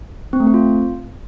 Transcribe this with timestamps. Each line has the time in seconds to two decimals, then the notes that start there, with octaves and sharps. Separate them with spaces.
0.33 C4
0.40 A3
0.47 C4
0.54 F4